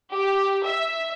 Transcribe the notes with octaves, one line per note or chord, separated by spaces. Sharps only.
G4
E5